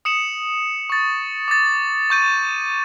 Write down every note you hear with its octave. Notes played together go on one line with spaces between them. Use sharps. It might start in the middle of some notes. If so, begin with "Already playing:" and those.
D#6 C#7 E7 F#7
C#6 A6
D6 A6
C#6 G6 D#7